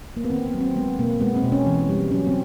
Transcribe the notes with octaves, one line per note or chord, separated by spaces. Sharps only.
A#3
B3
D#3 C4
B3
F#3
C4
G#3 B3
B2 A#3
G#3 B3
C4
B2
C#4
E3
G3
F#3 C#4
C4